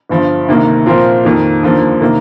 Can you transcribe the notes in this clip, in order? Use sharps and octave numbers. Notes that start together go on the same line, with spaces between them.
G1 G2 F3
D2 C3 D#3 A#3
A#2 F3 C4 F4 A#4
F2 D#3 A#3
D#2 D3 F3 A#3
C3 D#3 A#3